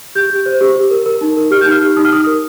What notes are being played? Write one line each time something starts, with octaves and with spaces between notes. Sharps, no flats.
G4 G6
G4
C5
G4
G4
A#4
A#4
D#4
A#4
G4 F6
D#4 G6
F6
G4
D#4 D#6
F6
D#4 D#6
A#4